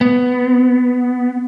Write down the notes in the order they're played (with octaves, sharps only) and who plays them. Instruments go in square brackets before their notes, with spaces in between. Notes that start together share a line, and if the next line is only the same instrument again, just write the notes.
[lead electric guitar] B3